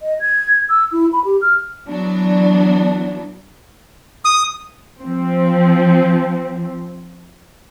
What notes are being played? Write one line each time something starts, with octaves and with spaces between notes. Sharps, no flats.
D#5
G#6
E6
E4
B5
G4
F6
E3 F#3 B3 D4
D#6
F3 C4